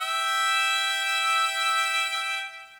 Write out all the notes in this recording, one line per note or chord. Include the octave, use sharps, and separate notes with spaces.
E5 G5 E6